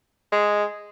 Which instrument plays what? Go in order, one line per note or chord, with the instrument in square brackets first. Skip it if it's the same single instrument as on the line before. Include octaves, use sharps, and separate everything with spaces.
[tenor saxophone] G#3